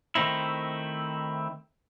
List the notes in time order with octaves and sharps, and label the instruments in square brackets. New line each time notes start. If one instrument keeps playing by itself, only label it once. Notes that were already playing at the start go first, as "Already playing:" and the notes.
[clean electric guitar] D#3 A3 C4 D#4 E4